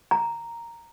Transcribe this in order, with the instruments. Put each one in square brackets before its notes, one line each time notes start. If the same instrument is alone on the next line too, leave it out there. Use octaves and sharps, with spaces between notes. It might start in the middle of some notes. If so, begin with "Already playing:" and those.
[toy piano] A#5